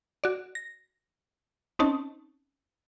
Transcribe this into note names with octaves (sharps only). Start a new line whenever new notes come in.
F#4 D5
A#6
C4 C#4 D#4 A5